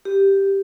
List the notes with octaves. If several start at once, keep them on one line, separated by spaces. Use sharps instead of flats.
G4